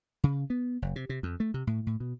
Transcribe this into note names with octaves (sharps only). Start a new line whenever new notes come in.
C#3
B3
F#1
C3
C3
F2
A3
C3
A2
A2
B2